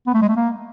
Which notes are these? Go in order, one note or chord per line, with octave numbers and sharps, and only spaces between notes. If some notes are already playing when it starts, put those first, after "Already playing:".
B3
A3
G#3
A3
A#3